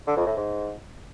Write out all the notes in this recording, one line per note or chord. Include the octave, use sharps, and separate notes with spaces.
D3
F2
A2
G#2